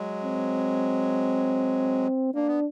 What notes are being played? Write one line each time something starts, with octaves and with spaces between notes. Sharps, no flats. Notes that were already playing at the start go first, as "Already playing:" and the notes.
Already playing: F#3 G#3
C4
A#3 D4
B3